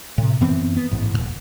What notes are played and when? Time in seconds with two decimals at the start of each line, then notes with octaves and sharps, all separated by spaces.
0.18 A2 C3
0.41 F#2 E3 B3 C4
0.77 B3
0.91 A1 G#2
1.14 D#1 G#2